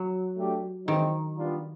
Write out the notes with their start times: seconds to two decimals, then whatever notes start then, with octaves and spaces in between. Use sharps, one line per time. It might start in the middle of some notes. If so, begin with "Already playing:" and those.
Already playing: F#3
0.37 A3 D4 G4
0.87 D#3 E3 G#3 C4 D#4
1.37 G3 B3 D4 F4